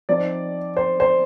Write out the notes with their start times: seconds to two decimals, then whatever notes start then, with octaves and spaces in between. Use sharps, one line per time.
0.09 F3 C4 D#4 D5
0.77 C5
1.00 C5